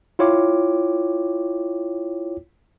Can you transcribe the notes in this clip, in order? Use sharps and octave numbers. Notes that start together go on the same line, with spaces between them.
E4 F4 C#5 G5 D6